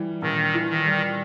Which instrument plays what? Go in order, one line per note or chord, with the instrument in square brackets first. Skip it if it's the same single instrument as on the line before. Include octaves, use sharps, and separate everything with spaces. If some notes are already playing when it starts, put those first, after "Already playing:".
Already playing: [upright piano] E3 G3
[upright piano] A#1 [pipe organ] D#3
[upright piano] E3
[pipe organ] D#3
[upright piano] G3